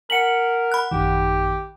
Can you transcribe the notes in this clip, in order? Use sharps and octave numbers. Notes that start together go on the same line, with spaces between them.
A#4 F#5 G#5 B6 C#7 F#7
B5 F#6
A1 F#2 D#3 G4